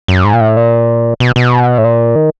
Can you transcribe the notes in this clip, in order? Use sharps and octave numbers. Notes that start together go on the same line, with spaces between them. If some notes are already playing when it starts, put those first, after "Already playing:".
F#2
G#2
A#2
A2
A#2
B2
B2
A2
A#2
D#3